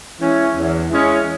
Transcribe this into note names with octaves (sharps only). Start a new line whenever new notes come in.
E3 G#3 C#4
E2
E3 G#3 C#4